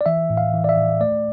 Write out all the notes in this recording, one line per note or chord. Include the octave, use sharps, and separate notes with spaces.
D5
E3 E5
A2
F5
E3
D5
E5
A2
A3 D5